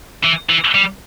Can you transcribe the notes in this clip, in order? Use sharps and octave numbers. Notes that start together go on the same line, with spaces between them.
E3
E3
G3